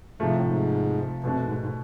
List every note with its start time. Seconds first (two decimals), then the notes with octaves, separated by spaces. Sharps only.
0.20 G#2 C3 F3 A3
0.31 A2
0.42 G#2
1.24 F2 B2 A3 D4
1.42 G#2
1.58 G#2